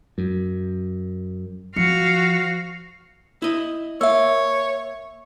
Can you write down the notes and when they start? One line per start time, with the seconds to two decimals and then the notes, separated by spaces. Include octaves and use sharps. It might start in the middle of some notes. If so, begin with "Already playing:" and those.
0.18 F#2
1.76 F3 F#4 F5 C#7
3.42 E4 D#5
4.01 A#3 C#5 E5 E6